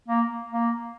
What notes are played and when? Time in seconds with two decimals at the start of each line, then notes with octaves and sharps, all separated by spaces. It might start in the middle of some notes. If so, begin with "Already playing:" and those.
0.08 A#3
0.52 A#3